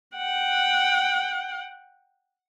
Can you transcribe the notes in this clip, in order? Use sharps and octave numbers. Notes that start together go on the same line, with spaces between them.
F#5 G5